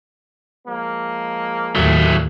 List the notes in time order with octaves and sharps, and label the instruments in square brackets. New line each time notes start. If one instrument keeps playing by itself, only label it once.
[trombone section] F3 G#3 A#3
[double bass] D#2 A2 [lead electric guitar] F#3 A3